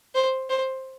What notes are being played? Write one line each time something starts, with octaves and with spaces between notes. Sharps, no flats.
C5
C5